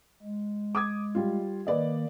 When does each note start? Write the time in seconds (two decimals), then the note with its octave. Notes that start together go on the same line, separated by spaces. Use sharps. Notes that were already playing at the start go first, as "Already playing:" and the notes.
0.22 G#3
0.75 D6 D#6 G#6
1.15 G3 F4
1.67 D#3 A#3 B4 D5 D#5